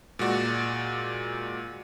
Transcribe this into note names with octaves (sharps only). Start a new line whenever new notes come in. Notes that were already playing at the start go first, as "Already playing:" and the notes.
A#2 G#3 F#4 D5